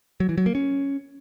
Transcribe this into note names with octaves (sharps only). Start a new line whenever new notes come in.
F#3
E3
F#3
A#3
C#4